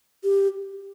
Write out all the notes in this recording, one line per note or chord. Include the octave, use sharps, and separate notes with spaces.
G4